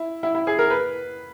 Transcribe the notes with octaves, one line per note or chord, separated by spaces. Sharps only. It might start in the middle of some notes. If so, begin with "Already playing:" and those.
Already playing: E4
E4
E4
G#4
A#4
B4